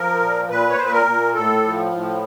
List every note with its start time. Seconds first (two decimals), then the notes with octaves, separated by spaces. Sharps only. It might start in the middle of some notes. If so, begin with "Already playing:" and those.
Already playing: F3 A#4
0.20 A#2
0.48 A#2 B4
0.69 C#5
0.78 A#2 C5
0.84 B4
0.91 A#4
1.06 A#2
1.35 A2 A4
1.63 F3
1.92 A2